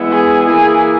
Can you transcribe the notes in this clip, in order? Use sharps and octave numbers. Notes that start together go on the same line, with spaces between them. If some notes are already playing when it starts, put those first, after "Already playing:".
Already playing: E3 G#3 B3 E4
G#4
E3 A#3 E4 G#4